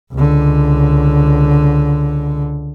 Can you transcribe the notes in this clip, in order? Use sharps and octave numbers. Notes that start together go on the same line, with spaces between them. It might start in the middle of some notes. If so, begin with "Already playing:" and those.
C#2 D3